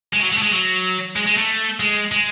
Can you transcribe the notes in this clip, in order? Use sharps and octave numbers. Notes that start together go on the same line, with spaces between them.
G#3
F#3
G#3
A3
G#3
F#3
G#3
G#3
A3
G#3
G#3